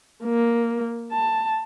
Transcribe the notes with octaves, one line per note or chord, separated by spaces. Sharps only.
A#3
A5